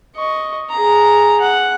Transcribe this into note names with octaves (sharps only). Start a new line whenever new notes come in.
D#5 C#6
G#4 A#5
F#5